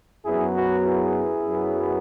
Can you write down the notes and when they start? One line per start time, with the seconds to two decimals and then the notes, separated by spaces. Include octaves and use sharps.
0.25 F#2 F#3 B3 E4 G#4
0.55 F#4 B4
0.85 E4 G#4
1.45 F#2 F#3 B3